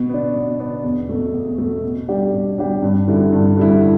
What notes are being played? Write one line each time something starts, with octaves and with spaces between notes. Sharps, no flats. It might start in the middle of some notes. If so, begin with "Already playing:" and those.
Already playing: B2
B3 D4
B2
B3 D4
E2
B2 A3
E2
B2 A3
B2
G3 D4 G4
B2
G3 D4 G4
G2
D3 G3 E4
G2
D3 G3 E4